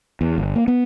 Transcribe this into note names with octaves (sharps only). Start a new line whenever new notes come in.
E2
G1
A#3
B3